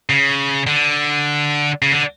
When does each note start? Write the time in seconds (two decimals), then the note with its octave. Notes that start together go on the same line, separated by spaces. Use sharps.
0.09 C#3
0.67 D3
1.82 C#3
1.92 D3